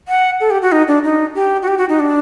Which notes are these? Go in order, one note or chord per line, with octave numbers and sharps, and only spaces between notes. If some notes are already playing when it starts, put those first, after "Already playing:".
F#5
A4
G4
F#4
D#4
D4
D#4
G4
F#4
G4
F#4
D#4
D4